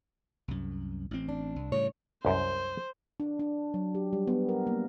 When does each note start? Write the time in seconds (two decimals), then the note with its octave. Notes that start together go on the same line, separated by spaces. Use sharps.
0.48 C2 F#2
1.11 A1 C4
1.29 D4
1.56 C2
1.72 A2 C#3 G3 C#5
2.25 C2 F#2 C5
3.20 D4
3.39 D4
3.74 F#3
3.95 G4
4.13 G3
4.27 B3
4.49 A#4
4.67 A#3